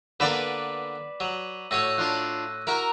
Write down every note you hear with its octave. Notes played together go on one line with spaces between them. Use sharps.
D3 A#3 B3 B4 D5 D6 B6 E7
F#3 D#7 F#7
A2 F#4 C#5 E6 A#6 D#7
D4 F4 F#6
E4 F#4 A#4